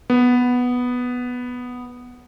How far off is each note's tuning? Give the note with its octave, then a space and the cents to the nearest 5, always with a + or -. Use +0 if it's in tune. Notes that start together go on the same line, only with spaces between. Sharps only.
B3 +0